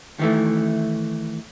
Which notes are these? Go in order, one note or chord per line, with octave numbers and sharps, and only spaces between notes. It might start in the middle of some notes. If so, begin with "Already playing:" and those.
D#3 E3 A3